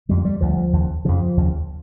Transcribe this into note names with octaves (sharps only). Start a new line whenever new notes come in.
F2 D3 G3
G3
D2 D3 F3
D#2 C#3
F2 C#3 F3
D#2 C#3